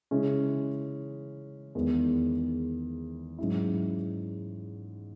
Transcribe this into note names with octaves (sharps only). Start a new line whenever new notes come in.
C#3 G#3 C#4 E4
E2 D#3 G#3 B3
G#2 F#3 C#4 E4